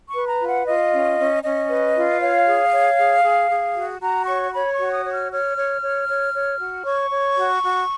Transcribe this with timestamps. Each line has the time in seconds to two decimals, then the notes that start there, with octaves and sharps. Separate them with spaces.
0.09 C#6
0.14 B4
0.27 A#5
0.41 F4
0.47 F#5
0.66 F4 D#5
0.92 C#4
1.18 C#4
1.43 C#4 D#5
1.69 B4
1.95 F4
2.21 C#5 F5
2.47 G#4
2.72 C#5
2.98 G#4
3.23 G#4
3.50 G#4
3.76 F#4
4.02 F#4 A#5
4.27 C#5 C#6
4.53 C#5 B5
4.73 C#6
4.79 F#4
4.92 D#6
5.05 C#5
5.12 F6
5.31 C#5 F6
5.57 C#5
5.82 C#5
6.08 C#5
6.33 C#5
6.60 F#4
6.85 C#5 C#6
7.11 C#5
7.37 F#4
7.62 F#4